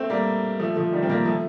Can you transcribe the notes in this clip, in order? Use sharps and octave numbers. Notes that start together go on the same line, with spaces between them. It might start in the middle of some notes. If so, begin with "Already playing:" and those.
Already playing: A3 C4
G3 A#3
F3 A3
F3 A3
D#3 G3
C4
G3 A#3
F3 A3